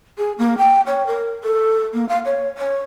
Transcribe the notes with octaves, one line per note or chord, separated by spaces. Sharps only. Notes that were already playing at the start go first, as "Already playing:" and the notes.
G#4
A#3
G5
C#5
A#4
A4
A#3
F5
C#5
C#5